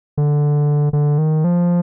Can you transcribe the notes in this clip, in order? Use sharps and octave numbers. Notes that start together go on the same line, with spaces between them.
D3
D3
D#3
F3